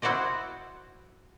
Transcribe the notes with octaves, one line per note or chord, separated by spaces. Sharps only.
E4 F#4 C5 D5 D#5